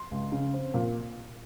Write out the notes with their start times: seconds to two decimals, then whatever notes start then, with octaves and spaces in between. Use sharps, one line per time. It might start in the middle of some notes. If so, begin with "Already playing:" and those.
Already playing: C6
0.11 C#2
0.32 C#3
0.53 C4
0.74 A#2